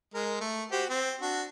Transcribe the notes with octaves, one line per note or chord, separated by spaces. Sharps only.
G#3 A#4
A3
F#4 G4 C5
C4
D4 F#4